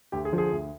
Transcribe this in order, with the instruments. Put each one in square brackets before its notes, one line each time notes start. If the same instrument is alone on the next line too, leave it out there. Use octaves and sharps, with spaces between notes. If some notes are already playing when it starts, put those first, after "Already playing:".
[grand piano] D2 G4
G#4
D3 F3
G#4
D2